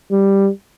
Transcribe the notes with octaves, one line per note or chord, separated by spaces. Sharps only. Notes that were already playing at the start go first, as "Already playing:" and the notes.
G3